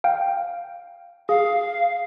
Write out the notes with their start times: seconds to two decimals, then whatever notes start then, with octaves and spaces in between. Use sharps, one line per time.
0.04 F5 G5
1.29 G#4 F5